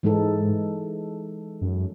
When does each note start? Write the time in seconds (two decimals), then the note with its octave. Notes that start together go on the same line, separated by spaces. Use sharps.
0.03 G#2 E3 G#3 D#4 A4
1.61 F#2